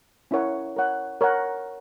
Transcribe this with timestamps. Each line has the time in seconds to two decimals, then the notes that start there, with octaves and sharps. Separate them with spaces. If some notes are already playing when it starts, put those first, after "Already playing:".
0.31 C#4 E4 A#4 C#5 F#5
0.76 A#4 C#5 F#5
1.21 A#4 C#5 F#5